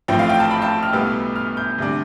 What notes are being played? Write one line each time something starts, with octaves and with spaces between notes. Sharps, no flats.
A1 A2 F3 C4 G5
F5
G5
A5
B5
A5
F6
B1 A2 G3 B3 E6
F6
G6
D2 C3 G3 D4